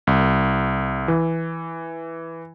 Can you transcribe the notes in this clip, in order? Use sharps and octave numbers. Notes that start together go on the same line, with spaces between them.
C2
E3